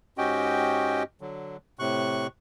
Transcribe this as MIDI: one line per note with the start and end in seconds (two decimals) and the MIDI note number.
0.18 1.03 44
0.18 1.03 61
0.18 1.03 66
0.18 1.03 67
0.18 1.03 75
0.18 1.03 79
1.21 1.57 50
1.21 1.57 54
1.79 2.27 45
1.79 2.27 48
1.79 2.27 85
1.79 2.27 90